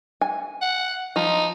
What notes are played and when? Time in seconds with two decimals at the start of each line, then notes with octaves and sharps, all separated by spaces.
0.21 G#5
0.61 F#5
1.16 F3 D#4